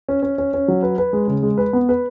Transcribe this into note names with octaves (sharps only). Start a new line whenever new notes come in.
C#4
C#4
C#4
C#4
F#3
B4
B4
G#3
C#3
G#3
B4
B3
B4